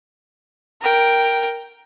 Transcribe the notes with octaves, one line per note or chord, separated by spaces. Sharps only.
A#4 G5